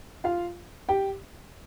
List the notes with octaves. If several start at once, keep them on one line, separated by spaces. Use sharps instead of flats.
F4 F5
G4 G5